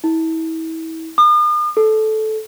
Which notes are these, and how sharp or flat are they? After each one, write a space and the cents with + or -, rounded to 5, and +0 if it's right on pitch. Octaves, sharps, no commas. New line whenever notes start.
E4 -35
D#6 -45
A4 -15